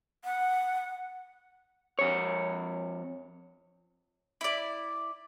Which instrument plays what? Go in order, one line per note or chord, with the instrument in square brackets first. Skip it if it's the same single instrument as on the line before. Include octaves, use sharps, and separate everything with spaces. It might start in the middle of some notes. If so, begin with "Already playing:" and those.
[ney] F#5
[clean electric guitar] F2 C#5
[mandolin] E4 D5